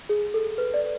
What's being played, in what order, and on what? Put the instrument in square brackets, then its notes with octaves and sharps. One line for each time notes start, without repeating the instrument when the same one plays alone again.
[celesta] G#4
A4
B4
D5